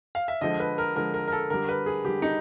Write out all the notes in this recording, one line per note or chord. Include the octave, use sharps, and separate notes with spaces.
F5
E5
D3 F3 G#3 D#5
B4
A#4
D3 F3 G#3 A#4
A#4
A#4
A4
D3 G3 A#4
B4
G#4
D3 G3 G4
D#4